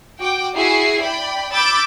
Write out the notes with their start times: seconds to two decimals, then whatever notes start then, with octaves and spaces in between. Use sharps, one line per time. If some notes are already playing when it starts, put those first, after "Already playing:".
0.18 F#4 G5 D6
0.55 E4 F#4 G#4 C7
1.00 D5 G5 B5
1.52 B5 D6 E6 G6 A6